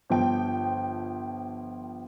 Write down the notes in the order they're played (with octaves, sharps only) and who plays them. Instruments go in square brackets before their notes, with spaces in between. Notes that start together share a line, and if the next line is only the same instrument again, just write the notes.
[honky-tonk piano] G1 F3 G5